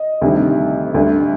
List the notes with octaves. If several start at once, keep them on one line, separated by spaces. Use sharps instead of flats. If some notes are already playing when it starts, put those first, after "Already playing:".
Already playing: D#5
D2 C3 D#3 G3
D2 D3 G3